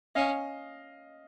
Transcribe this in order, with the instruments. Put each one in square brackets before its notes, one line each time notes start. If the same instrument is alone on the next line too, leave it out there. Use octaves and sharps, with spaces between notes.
[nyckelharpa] C#4 [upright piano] D#5 F5